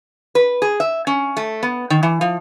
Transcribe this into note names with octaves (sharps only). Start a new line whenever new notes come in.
B4
G#4
E5
C#4
A3
B3
D#3
E3
F3